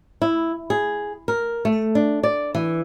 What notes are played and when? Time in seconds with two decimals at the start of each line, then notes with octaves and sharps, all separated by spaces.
0.22 E4
0.70 G#4
1.28 A#4
1.65 A3
1.95 D4
2.23 D5
2.55 E3